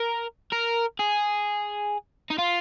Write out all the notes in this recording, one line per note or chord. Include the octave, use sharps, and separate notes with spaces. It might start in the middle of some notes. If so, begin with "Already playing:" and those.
Already playing: A#4
A#4
G#4
D#4
F4